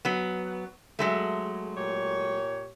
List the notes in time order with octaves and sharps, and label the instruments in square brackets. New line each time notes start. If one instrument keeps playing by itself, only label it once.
[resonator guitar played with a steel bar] F#3 B3
F#3 G#3 A3
[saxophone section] A#2 G4 C#5